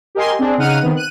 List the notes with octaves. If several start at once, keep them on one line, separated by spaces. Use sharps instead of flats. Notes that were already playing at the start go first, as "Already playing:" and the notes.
G4 A#4 D#5 G#5 C6
C4 D4 G#4
C#3 D#4 F#5 F6 D#7
C3 D#3 B3
F#6 D#7